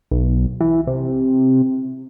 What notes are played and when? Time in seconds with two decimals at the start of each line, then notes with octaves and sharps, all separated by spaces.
0.11 B1
0.61 E3
0.87 C3